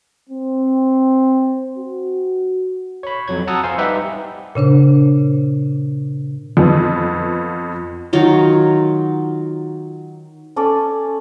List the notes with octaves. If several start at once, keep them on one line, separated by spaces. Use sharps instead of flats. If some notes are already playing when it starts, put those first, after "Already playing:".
C4
F#4
C#5 B5
F2 F#3 G#6
F#5 A5 A#5 D#6 E6
C5 F5 G#5
G3 D#4 G4 B4 E5 F#5
A#2 C#3 D4 C5
F2 F3 B3
D#3 F#3 F4
C#4 A4 D5